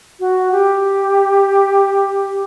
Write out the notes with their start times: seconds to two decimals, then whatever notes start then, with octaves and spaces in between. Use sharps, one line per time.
0.20 F#4
0.52 G4